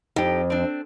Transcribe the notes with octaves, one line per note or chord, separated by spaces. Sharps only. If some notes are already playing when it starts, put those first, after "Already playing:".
F2 D#4 G4
C4 D4